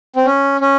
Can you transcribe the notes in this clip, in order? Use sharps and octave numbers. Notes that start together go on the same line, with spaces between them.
C4
C#4
C#4